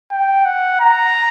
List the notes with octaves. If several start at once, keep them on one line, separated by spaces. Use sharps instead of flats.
G5
F#5
A#5